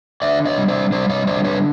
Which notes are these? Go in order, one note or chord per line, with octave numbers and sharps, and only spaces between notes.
D3 D5 E5
C#5 D#5
G3
C5 D5
G3 C5 D5
C#5 D#5
D3 C5 D5
B4 C#5